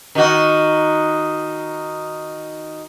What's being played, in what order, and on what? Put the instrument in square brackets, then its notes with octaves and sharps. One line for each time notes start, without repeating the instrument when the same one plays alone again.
[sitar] D#3 F#4